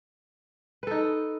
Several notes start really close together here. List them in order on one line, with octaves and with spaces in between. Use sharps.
B4 A4 D#4